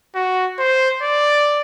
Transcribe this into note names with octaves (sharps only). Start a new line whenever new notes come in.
F#4
C5
D5